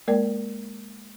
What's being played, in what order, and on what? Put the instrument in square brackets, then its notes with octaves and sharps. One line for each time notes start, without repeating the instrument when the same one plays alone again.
[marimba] G#3 A#3 A#4 D5 G5